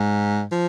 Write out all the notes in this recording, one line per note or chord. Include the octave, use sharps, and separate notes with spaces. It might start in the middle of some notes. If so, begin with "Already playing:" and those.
Already playing: G#2
F3